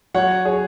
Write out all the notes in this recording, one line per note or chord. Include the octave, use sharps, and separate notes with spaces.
F#3 C#5 F#5
G#4 C#5